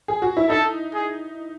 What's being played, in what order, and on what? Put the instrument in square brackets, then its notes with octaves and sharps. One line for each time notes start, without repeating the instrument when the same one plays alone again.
[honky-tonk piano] G#4
F#4
E4
[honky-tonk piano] D#4 [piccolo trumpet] A4
[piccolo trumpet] G#4